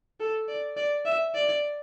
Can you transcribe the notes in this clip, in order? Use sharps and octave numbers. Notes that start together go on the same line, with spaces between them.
A4
D5
D5
E5
D5